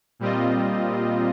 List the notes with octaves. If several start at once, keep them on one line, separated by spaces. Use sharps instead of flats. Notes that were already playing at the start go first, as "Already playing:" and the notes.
A#2 G3 C4 F4 D#5